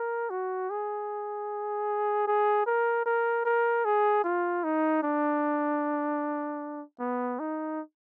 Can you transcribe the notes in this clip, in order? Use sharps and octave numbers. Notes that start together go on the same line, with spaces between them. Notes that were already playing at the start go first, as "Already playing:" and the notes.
Already playing: A#4
F#4
G#4
G#4
A#4
A#4
A#4
G#4
F4
D#4
D4
B3
D#4